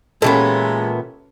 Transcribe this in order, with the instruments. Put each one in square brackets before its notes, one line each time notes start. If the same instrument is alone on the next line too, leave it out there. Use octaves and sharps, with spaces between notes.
[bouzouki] A#2 E3 B3 [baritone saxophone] G#3 [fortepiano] C#4 G4 A4